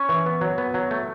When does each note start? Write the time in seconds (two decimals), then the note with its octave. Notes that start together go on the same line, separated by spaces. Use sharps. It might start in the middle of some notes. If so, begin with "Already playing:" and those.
Already playing: C#4 C#6
0.09 E3
0.26 B3
0.41 F#3
0.58 B3
0.74 F#3
0.91 A3